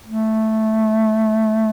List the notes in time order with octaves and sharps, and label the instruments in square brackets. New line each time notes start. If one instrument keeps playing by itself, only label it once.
[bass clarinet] A3